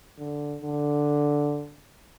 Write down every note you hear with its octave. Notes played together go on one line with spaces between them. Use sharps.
D3
D3